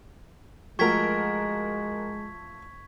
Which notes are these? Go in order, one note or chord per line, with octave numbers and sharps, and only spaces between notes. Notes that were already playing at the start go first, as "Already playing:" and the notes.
F3 G#3 A3 F#4 A#4 C#6 G#6 B6